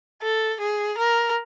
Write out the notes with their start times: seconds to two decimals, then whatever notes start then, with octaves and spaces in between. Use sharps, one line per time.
0.23 A4
0.61 G#4
0.98 A#4